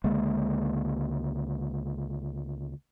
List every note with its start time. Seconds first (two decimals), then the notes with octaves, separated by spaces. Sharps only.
0.04 C#2 D3 G#3 A#3